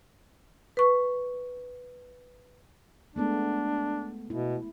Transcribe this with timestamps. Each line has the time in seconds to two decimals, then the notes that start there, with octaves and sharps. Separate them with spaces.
0.77 B4 C#6
3.16 G#3 A3 B3 D4
4.30 B2 E4